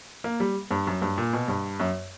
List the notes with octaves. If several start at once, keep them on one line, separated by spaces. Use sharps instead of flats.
A#3
G3
G2
F#2
G2
A#2
B2
G2
F#2